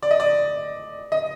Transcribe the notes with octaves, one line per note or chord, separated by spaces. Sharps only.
D5
D#5
D5
D#5